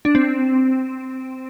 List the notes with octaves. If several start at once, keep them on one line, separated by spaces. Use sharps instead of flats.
D4
C4